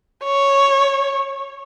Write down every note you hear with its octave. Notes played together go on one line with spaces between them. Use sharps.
C#5